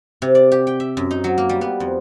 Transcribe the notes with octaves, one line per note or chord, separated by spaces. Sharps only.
C3
D5
G4
G5
E5
F#2
D#4
F#3
A#3
G3
B3
F2